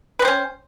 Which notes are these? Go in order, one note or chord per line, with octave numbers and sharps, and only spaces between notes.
C4 C#4 B4 C5